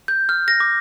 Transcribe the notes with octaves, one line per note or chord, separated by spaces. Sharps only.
G6
F6
A#6
D6